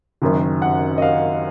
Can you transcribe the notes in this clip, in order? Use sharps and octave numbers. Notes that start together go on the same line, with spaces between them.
F#1 F#2 D#3
F#5
D#5
F5